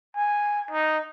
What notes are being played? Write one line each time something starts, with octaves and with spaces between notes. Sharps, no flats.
G#5
D#4